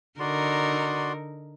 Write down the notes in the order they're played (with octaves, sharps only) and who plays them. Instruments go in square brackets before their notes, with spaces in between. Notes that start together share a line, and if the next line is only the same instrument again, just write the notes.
[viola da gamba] D3 D#4 A#4 [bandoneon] F#4 D5 C6